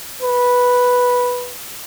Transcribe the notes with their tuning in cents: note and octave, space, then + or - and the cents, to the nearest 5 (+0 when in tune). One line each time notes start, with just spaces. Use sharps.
B4 -5